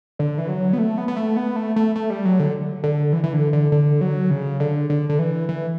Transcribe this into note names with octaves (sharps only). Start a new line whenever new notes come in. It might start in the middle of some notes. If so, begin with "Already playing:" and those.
D3
E3
F#3
B3
A3
B3
B3
A3
B3
A3
A3
A3
G3
F#3
D3
D3
E3
E3
D3
D3
D3
F#3
C#3
D3
D3
D3
E3
E3